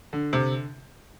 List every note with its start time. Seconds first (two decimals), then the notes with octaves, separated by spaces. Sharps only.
0.13 D3
0.33 C3